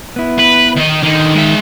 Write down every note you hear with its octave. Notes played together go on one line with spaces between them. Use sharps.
B3 E4
B4
D#3 D#5
D3 D#3 D#4
G#3 E5